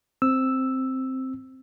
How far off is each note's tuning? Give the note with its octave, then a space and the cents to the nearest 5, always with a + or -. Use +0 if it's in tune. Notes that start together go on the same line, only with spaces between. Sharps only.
C4 +0 E6 +0